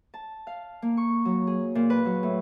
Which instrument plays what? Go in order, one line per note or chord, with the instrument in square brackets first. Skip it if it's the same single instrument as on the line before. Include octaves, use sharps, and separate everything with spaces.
[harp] A5
F5
A#3
C#6
F#3
G#4
A#2
B4
F#3
A2